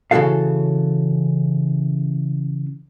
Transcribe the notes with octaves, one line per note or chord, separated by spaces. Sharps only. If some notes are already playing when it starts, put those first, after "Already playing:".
C#3 E3 G#3 F#4 A4 F5